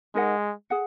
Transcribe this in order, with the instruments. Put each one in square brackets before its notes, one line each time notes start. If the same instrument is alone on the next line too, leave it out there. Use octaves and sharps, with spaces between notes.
[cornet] G#3 [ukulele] D#4 A#4 D#5 F#5
[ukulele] G#4 F#5